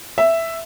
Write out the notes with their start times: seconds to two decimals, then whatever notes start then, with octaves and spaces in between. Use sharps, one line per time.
0.18 E5